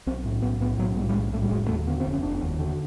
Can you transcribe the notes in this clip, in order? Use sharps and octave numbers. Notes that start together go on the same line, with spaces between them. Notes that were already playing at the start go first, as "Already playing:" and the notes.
B1 C4
A2
B1 B3
A2 B3
B1 F#3
A2 G3
G3
B1 G#3
A2 A3
G3
F1 G#3
D#2 A3
D3 B3
C4
F1
C#4
F1 D4
D#2
D3